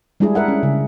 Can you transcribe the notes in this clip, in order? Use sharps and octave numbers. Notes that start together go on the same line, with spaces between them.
G3 G#3 D4 E4 G#4
A#4 E5 F#5
C#4
C#3